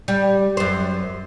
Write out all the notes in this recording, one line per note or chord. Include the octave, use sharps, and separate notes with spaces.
G3
F#2 C5